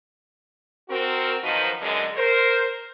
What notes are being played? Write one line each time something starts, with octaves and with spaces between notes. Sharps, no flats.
C4 F#4 A#4
D#3 F3 F#3 D#4 B4 C5
F#2 D3 G#3
A#4 C5